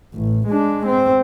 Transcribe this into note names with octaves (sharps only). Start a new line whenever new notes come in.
A1
G#3 D4
C4